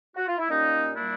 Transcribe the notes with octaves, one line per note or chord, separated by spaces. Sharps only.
F#4
F4
E4
A#2 G3 A#3 C#4 D#4
A#2 G3 A#3 D4 E4